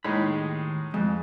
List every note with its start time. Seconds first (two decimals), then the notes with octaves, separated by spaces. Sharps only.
0.04 D#2 A2 G#3 D#4 B5
0.94 F2 G#3